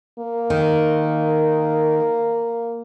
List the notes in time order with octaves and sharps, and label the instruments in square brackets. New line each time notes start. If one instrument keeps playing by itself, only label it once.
[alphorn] A#3
[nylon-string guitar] D#3